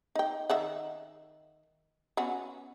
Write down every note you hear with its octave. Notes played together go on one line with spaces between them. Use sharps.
D#4 G5
D#3 E5 F#5
B3 C#4 F#4